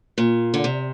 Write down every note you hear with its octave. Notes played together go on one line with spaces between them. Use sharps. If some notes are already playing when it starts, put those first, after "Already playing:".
A#2
D3
C3